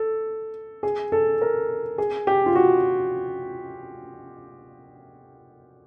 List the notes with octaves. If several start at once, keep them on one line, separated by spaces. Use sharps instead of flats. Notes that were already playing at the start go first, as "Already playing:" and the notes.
Already playing: A4
G#4
A4
A#4
G#4
G4
F4
F#4